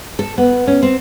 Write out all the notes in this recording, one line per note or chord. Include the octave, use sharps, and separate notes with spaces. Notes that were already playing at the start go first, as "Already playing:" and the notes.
A4
B3
C#4
C4